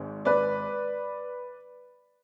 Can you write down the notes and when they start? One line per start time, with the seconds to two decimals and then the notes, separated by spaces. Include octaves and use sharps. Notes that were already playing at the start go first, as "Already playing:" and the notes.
Already playing: G#1 G#2
0.25 B4 D5